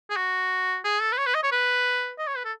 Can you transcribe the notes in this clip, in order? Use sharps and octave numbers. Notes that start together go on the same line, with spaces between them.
G#4
F#4
G#4
A4
B4
C#5
B4
D#5
C#5
B4
D#5
C#5
B4
A4